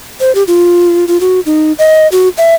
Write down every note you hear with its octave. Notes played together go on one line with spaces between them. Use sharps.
C5
G4
F4
F4
F#4
D#4
D#5
F#4
E5